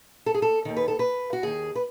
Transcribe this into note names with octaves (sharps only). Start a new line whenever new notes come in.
A4
G#4
A4
D#2 D#3
B4
A4
B4
F#4
D#2 D#3 G#4
B4